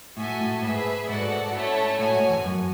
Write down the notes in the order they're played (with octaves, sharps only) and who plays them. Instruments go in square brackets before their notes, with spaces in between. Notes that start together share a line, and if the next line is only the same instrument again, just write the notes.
[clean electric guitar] A2 [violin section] F#4 A4 E5 G#5
[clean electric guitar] A2
[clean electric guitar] G#2 [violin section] G#4 B4 E5
[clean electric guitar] G#2 [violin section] F#4 A4 D5 F#5
[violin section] A3 C#4 E4 A4 C#5
[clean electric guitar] A2 [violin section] F#4 C#5 G#5
[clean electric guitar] G#2
E2
F#2